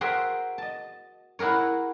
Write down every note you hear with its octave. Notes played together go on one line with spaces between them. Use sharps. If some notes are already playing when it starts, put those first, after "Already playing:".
F#4 G#4 A#4 C5 E5 G5
D#5 A5
E4 F#4 G#4 A#4 C#5